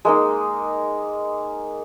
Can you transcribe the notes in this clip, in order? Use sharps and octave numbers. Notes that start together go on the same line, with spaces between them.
G#3 A#3 D#4